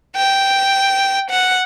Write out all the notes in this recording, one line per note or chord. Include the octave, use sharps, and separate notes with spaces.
G5
F#5